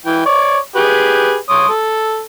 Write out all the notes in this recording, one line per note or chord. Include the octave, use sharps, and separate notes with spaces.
E3 G5
C#5 D5
G4 G#4 B4
C#5 C6 D#6
A4